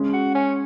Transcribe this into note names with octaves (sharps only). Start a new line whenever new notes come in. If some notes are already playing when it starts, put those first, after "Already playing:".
Already playing: C#3 G#3 C#4
F#4
C#4